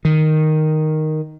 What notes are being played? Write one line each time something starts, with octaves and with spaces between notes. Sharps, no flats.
D#3